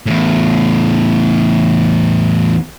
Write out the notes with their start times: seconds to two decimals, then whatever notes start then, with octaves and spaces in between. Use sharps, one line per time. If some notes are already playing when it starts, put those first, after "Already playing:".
0.06 E2 A2